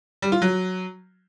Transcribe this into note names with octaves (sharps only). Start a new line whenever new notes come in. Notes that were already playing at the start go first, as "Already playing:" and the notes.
G3
F4
F#3